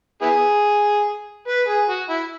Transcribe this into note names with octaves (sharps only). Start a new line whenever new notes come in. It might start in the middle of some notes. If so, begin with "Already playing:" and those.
B3 E4 G#4
B4
G#4
F#4
E4